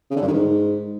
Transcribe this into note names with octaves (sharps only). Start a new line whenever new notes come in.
C#3
D3
G2
D#3
G#2